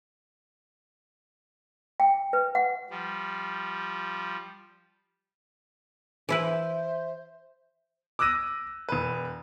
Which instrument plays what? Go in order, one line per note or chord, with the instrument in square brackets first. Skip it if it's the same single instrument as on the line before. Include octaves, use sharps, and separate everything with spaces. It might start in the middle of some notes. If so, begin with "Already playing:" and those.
[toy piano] G5
B4
F#5
[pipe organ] F3 G3
[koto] E3 E4 B4 [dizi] C5 [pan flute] E5
[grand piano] D6 E6 F#6 A#6 D#7
E1 B4